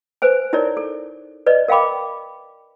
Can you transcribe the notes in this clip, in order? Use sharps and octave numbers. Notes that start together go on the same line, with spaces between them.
B4 C5 G#5
D#4 E4 A#4 C#5 D5
A4
B4 D5 D#5
A#4 F5 G5 B5 D6